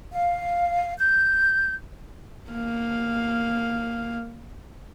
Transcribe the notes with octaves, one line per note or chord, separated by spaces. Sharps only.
F5
G6
A#3 F5